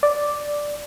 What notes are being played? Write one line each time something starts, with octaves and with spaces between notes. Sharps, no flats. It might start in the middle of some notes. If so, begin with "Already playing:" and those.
D5